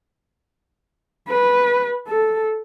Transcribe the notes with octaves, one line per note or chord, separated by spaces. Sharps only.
B4
A4